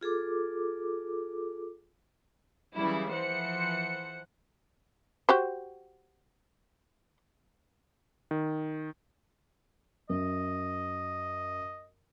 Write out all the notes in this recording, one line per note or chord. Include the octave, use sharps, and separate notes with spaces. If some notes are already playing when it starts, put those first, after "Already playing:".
F4 G#4 A4 D6
C#3 E3 F#3 G3 E4
E3 F3 C5 F#5 C#7
F#4 G4 C5
D#3
F#2 D#5